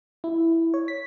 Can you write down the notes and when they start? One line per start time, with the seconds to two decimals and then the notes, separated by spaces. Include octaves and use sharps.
0.24 E4
0.74 C#5
0.88 B6